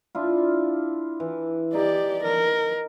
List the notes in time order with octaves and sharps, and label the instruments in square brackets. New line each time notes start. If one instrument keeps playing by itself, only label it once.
[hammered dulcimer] D4 E4 F4
E3
[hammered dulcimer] D#4 [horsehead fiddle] G4 D5
[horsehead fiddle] A#4